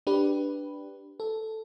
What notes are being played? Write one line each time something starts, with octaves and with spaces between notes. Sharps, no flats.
D4 G4 B4
A4